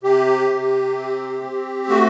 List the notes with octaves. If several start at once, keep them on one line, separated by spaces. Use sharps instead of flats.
C3 G4
C3
C4
C4
A3 F#4